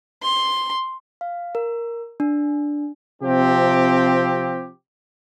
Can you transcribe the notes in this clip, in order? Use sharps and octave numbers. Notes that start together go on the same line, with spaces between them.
C6
F5
A#4
D4
C3 F3 C4 G4